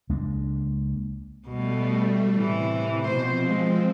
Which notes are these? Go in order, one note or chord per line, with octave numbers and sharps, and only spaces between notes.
C#2 G#3 A#3 D4
B2 G3 A3
A2 C3 E3
B2 F3 C4 C5
G#3